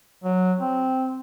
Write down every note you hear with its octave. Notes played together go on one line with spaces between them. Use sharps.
F#3
C4